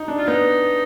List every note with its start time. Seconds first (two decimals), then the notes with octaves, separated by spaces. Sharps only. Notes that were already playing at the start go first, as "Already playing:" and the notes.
Already playing: D#4
0.08 D4
0.18 F4
0.28 B3 D#4